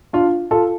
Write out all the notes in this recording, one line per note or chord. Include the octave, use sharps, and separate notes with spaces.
D4 F4
F4 A4